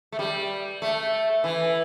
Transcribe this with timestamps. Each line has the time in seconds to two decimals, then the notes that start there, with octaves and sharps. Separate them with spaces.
0.12 A3
0.19 G3
0.82 A3
1.44 E3